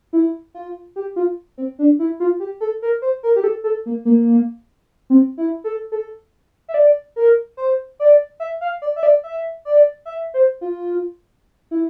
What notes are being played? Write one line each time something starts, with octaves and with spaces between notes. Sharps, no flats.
E4
F4
G4
F4
C4
D4
E4
F4
G4
A4
A#4
C5
A#4
G4
A4
A4
A#3
A#3
C4
E4
A4
A4
E5
D5
A#4
C5
D5
E5
F5
D5
E5
D5
E5
D5
E5
C5
F4
E4